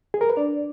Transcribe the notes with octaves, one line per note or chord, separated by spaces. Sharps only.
G#4
A#4
B4
D4 D5